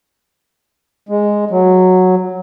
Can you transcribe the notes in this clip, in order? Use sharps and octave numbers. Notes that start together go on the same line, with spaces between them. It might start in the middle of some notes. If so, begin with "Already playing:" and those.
G#3
F#3